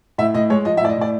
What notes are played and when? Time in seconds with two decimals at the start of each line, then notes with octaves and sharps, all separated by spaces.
0.18 A2 E5
0.34 A2 D#5
0.50 G#3 C#5
0.65 F3 D#5
0.77 E5
0.81 A2 D5
0.89 D#5
0.97 A2 D5